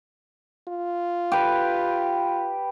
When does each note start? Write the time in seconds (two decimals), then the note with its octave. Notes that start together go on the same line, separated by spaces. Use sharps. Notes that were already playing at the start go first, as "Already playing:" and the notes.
0.68 F4
1.32 G4 B4